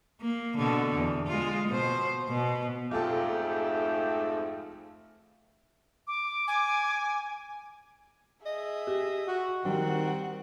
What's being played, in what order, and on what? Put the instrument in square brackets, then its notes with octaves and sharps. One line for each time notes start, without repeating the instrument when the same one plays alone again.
[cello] A#3
B2 D3
E2
G#3 F4
B2 C5
B2
[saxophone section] F2 G#2 [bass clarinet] A3 [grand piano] F4 A4 A5 [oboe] G4
[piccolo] D6
[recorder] G#5
[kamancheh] G#4 E5 [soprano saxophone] D#5
[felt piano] G4
[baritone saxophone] F#4
[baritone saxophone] D#3 [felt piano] G3 [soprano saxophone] C4 [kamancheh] F#4 F#5